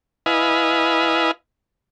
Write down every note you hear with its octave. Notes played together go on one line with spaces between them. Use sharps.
E4 B4 D#5 F5 G#5